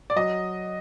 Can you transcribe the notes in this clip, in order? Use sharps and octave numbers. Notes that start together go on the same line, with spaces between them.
D5
F#3 D#5